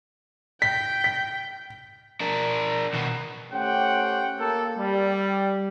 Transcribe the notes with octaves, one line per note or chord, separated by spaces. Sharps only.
G5 B6
B6
D4 A#4
D#2 B2
A3 C#4 G4 C5 F#5 G5
A#3 A4
G3